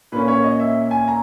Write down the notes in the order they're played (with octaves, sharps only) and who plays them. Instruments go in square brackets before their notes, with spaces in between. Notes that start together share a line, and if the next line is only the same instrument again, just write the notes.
[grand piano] A#2 A#3 C#4 B4
C#5
D#5
E5
G#5
A#5